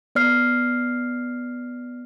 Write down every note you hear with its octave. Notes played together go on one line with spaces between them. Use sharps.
B3 D5 F6 C7